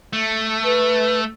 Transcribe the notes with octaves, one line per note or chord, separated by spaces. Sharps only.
A3
B4